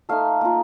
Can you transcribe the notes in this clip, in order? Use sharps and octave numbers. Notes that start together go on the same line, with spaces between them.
A3 D#4 F5
A#3 F4